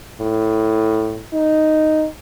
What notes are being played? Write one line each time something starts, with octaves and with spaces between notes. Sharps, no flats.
A2
D#4